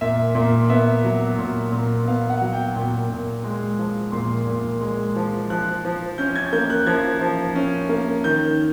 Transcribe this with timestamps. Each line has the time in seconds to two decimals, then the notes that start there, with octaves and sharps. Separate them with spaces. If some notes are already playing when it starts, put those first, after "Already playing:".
0.01 A#2 E5
0.35 A#2
0.70 B3 E5
1.04 F#3
1.38 A#2
1.72 A#2
2.07 B3 F5
2.30 F#5
2.42 F#3
2.53 G5
2.76 A#2
3.09 A#2
3.44 G#3
3.79 F3
4.12 A#2 C6
4.47 A#2
4.81 G#3
5.16 F3
5.50 F3 F#6
5.85 F3
6.18 C#4 G6
6.36 G#6
6.53 A#3 G6
6.70 F#6
6.87 F3 G#6
7.21 F3
7.55 C#4
7.89 A#3
8.24 D#3 G6